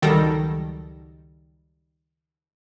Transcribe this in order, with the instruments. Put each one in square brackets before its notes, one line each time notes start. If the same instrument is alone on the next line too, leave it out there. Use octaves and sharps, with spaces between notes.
[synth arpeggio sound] C#2 D#3 F#3 G3 A4 A#6